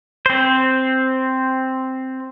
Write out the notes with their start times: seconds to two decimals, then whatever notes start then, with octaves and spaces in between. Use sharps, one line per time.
0.26 C4 C5